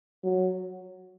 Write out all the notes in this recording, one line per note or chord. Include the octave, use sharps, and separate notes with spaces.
F#3